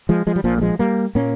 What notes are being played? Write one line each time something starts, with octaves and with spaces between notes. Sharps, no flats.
F3 G#3
F3 G#3
G3
A#1 A#2 F3
A#3
F3 G#3
G3 A#3
A#2 A#3 C#4